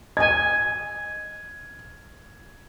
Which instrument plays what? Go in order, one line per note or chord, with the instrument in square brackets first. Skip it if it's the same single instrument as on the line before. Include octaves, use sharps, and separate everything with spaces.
[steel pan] D#5 G#5 [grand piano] G#6